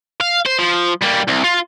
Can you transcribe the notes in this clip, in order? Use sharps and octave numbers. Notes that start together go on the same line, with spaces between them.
F5
C5
F3
G3 A#3
C2
F4